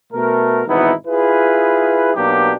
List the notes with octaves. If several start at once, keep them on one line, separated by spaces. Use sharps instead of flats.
B2 A3 A#4
G#1 B2 E3 B3 D#4 E4
E4 F4 G#4 B4
B2 F#3 A#3 D4 D#4 G4